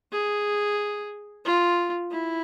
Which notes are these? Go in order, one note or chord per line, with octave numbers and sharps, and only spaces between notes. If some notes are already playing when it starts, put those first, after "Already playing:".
G#4
F4
E4